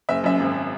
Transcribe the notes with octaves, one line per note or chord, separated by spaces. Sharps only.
F#1 E5
F#2 E5
G#1